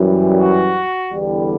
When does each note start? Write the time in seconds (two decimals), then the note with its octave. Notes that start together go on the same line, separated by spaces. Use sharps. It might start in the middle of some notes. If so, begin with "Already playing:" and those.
Already playing: F#2 E3 G3
0.40 F#4
1.12 E2 D3 G3